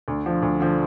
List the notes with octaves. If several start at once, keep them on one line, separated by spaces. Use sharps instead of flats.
D2
D3 F3
D2
D3 F3